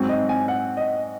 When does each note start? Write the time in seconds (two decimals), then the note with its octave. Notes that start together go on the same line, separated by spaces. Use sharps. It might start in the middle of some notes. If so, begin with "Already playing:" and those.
Already playing: G#2 F#3 C4
0.09 D#5
0.29 G#5
0.48 F#5
0.77 D#5